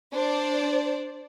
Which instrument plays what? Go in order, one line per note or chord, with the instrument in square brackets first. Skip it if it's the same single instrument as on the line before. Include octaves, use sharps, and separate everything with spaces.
[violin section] D4 C5 D5